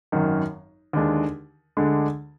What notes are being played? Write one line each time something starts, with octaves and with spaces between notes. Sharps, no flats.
G#1 F#2 D#3
D#2 D3 G#3 D4
D2 D3 G#3 D4